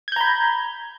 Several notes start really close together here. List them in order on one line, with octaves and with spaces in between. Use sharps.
G#6 G6 A#5 B5